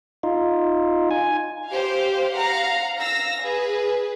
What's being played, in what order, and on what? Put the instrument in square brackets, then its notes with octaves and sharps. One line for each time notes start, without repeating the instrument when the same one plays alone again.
[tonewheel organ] D#4 F4
G#5
[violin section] G4 C5 F5
F5 F#5 A#5
F5 E6 A#6
G#4 B4